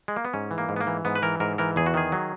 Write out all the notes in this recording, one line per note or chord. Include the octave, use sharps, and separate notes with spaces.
G#3
A#3
B3
G#2 C#4
E3
A#3
G#2
B3
A#3
E3
G#2 B3
B4
E3 A#4
G#2 A#4
E3 A#4
E2 G#4
F#4
D#3 G#4
F#3